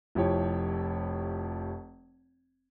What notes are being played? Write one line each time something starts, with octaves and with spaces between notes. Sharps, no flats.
F1 F3 E4 G4 C#5